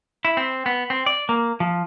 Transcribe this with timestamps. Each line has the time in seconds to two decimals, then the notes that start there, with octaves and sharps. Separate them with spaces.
0.25 E4
0.37 C4
0.66 B3
0.90 C4
1.06 D5
1.29 A#3
1.60 F3